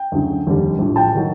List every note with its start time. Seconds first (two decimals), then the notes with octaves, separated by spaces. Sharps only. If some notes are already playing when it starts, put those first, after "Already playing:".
Already playing: G5
0.12 D2 C#3 F#3
0.46 F1 D#2 D3 G3
0.79 A#1 A2 F3
0.96 G5 A5
1.15 D#3 F#3